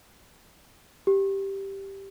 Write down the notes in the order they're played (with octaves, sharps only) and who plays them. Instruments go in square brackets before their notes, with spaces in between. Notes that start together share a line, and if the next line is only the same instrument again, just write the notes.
[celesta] G4